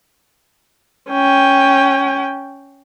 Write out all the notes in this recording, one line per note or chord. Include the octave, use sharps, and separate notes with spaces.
C#4 G5